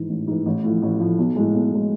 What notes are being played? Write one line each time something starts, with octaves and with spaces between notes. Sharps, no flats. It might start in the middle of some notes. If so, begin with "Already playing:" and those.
Already playing: G#2 E3
A1
G#2 E3
A1
A2 F3
A1
A2 F3
B1
A2 G#3
B1
A2 G#3